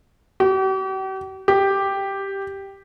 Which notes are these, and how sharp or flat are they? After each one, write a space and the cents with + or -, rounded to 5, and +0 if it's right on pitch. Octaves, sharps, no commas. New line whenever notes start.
G4 -45
G4 +0